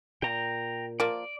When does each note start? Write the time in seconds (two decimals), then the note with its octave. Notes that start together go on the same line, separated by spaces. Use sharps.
0.22 A#2 G5 A#5
1.00 F3 A#3 D5